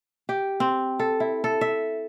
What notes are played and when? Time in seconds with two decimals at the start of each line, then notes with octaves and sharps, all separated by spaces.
0.29 G4
0.60 C4
0.99 A4
1.20 E4
1.44 A4
1.61 E5